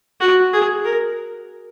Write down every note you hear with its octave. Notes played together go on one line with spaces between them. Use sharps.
F#4
G#4
A#4